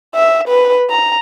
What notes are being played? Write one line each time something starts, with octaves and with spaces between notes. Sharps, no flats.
E5
B4
A#5